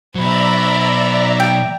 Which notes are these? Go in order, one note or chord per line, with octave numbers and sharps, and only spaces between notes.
B2 F#3 C5 D5 E5 A#5 B5
G5